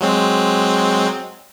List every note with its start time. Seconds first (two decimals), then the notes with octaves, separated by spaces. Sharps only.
0.01 F#3 G#3 C4